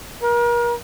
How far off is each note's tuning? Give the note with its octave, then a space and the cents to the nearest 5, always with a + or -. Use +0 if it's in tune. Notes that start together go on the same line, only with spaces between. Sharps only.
A#4 +35